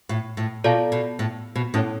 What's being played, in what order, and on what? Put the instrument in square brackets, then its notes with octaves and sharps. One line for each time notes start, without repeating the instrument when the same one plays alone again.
[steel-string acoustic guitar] A2
A2
[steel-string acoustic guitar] B2 [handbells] F4 A4 D5 F5 A5
[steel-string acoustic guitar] B2
A2
B2
[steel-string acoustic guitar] A2 [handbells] C#4 E4 A4 C#5